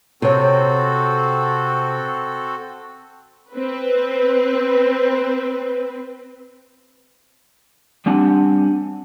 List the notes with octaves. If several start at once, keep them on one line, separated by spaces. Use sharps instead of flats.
C3 C4 F#4 A4 C#5
C4 B4
G3 C4 D4 G4 F#5 G#5